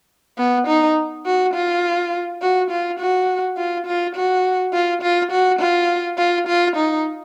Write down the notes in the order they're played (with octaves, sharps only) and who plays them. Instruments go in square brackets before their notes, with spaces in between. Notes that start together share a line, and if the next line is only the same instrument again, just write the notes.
[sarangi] B3
D#4
F#4
F4
F#4
F4
F#4
F4
F4
F#4
F4
F4
F#4
F4
F4
F4
D#4